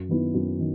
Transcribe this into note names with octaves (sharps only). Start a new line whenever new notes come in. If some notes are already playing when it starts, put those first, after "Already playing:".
Already playing: F#2
D#3 F#3 B3 E4
F#2
D#3